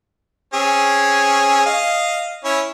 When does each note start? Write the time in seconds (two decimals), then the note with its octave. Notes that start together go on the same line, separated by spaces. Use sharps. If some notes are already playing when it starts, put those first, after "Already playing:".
0.54 C4 C#4 G#4
1.66 D#5 F5
2.44 C#4 E4 C#5